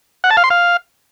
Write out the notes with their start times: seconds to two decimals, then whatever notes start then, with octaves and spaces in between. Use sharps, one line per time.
0.24 F#5
0.30 A5
0.37 F5
0.44 C6
0.50 F5